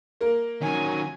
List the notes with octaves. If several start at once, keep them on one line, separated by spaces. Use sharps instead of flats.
A#3 A#4
D#3 F#3 C#4 G#5